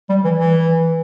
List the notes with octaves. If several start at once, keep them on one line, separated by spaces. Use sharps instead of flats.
G3
E3
E3